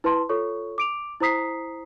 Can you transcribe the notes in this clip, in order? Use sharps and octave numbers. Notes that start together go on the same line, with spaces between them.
E4 B4 A5 C6
F4 A4 C#5 C#6
D6 D7 F7
E4 C5 A#5 D#6 B6 C7